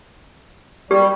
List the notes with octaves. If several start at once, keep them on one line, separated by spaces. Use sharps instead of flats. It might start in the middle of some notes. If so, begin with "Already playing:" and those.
G3 G4